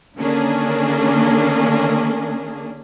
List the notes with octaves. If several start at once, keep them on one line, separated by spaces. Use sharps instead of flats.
D3 D#3 A#3 C#4 D4 G#4